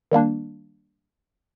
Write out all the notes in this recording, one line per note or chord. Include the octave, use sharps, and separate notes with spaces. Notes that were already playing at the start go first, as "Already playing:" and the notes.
D#3 G3 A#3 D4